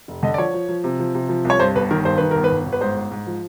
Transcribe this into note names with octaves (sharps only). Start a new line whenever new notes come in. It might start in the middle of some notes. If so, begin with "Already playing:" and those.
F1
D3 D#5
D5
F3 C#5
F3
F3
C3
F3
C3
F3
C2
C#5
G2 C5
G1 B4
D#3 A#4
G2 C5
D#3 B4
G1 A#4
B4
G1
G1
B4
G#2 C5
G#2
G#2
F3